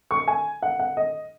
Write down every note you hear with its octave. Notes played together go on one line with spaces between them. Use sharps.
C#6
G#5
F#5
F#5
D#5